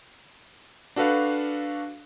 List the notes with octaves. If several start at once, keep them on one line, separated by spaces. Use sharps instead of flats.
D4 F#4 A4 B4 F5